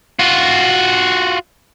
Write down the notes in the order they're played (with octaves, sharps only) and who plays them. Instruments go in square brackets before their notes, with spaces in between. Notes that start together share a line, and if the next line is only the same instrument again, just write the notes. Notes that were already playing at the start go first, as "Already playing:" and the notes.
[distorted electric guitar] F4 F#4